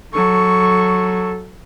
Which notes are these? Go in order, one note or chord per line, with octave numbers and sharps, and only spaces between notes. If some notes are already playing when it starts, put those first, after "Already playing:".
F#3 A4 C#6